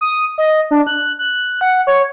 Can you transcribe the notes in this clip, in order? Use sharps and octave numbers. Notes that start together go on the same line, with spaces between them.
D#6
D#5
D4
F#6
F#6
F#5
C#5